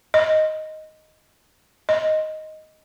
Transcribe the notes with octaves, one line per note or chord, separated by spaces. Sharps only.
D#5
D#5